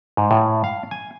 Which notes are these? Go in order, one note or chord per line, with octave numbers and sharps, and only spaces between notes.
G#2
A2
F5
G#5